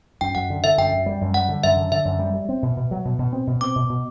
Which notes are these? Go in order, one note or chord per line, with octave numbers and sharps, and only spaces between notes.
F#2 G5
F#2 F#5
D3
D3 E5
F#2 G5
F#2
G3
F#2
G3 F#5
D3
F#2 E5
D3
D3 E5
F#2
G3
G3
C4
B2
B2
F#3
B2
B2
C4
B2
C4 D6
B2
B2